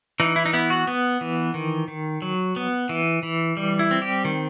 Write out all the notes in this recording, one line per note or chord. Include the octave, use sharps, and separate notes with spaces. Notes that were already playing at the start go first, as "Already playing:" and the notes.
E3 D#4
E4
D#4
B3 E4
F#4
B3
E3
D#3
D#3
F#3
B3
E3
E3
G3
E4
C4
G4
D#3